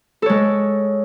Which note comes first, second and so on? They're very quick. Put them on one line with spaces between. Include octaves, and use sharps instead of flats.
A4 C#5 G#3